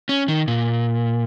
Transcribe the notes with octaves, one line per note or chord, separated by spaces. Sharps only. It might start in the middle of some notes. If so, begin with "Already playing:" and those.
C#4
D#3
A#2